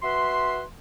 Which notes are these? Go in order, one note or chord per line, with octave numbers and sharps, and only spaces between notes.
F#4 B4 E5 C6